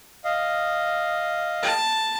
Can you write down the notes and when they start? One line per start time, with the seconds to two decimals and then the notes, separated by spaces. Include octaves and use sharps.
0.24 D#5 F5
1.63 A5